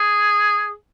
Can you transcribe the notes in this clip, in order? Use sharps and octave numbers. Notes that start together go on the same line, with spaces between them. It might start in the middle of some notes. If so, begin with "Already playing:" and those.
Already playing: G#4